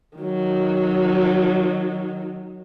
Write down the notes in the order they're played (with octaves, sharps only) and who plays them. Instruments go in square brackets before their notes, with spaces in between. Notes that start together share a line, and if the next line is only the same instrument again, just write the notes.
[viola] D#3 F#3